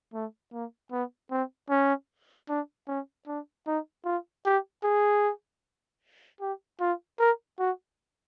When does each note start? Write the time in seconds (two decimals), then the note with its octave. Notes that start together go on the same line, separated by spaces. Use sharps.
0.13 A3
0.53 A#3
0.92 B3
1.31 C4
1.70 C#4
2.49 D4
2.88 C#4
3.27 D4
3.67 D#4
4.05 F4
4.46 G4
4.84 G#4
6.41 G4
6.80 F4
7.20 A#4
7.59 F#4